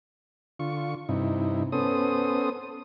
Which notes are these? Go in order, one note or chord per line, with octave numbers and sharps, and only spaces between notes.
D3 F4 C#6
G2 C3 D#4 E4
B3 C#4 A4 C5 D#6